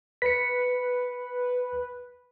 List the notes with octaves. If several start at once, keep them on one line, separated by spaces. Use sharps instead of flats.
B4 B6 C#7